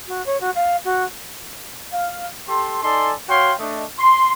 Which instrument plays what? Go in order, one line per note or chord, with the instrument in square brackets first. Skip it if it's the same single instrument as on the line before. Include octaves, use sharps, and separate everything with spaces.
[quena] F#4
C#5
F#4
F5
F#4
[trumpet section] F5
G4 A4 C6
D#4 A4 D5 G#5 C6
F#4 C#5 F5 G5 C6
A3 D4 D#5
C6